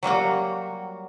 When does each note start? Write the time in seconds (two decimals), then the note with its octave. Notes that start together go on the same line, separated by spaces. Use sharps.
0.03 F#3 G3 A#3 F#4